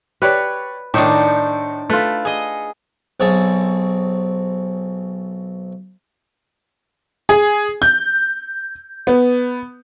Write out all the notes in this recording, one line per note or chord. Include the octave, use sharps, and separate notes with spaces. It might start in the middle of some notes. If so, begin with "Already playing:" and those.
G4 B4 C#5 D5
A2 D#3 D4 D#4 C5
A3 F4 B4
G#4 D#5
B1 C4 G#4 C#5 A5
G#4
G6
B3